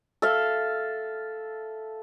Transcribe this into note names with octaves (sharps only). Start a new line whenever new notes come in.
A4 E5 F5